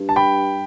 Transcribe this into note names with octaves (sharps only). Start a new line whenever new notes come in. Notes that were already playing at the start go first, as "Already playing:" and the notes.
Already playing: G2
A5
G5 B5